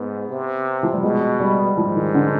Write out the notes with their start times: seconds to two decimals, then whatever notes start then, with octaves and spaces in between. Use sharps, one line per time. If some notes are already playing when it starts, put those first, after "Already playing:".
Already playing: G#2 B3
0.29 C3
0.83 F3
0.93 G3
1.03 B2 G#3
1.40 G3
1.77 G#2 F3
1.95 D#3
2.15 D3